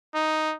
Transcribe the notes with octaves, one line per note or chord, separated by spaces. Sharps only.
D#4